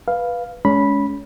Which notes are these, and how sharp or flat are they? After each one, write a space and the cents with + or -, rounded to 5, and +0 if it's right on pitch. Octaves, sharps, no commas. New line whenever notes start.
B4 -10 F5 +0
G#3 +20 C#4 +25 B5 -10